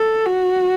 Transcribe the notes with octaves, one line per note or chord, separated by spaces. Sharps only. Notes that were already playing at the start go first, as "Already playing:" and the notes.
Already playing: A4
F#4